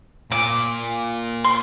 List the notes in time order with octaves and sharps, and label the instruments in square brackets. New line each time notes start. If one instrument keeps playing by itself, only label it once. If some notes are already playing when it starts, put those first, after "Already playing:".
[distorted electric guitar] A#2 [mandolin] D6
[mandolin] C6